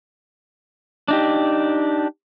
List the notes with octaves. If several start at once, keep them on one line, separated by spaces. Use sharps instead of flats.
D4 D#4 G4